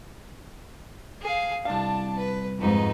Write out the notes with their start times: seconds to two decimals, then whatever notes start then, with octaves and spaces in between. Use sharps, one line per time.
1.22 G#4 F5
1.65 C2 D4 F5 A5
2.17 B4
2.59 F2 G#2 D#4 B4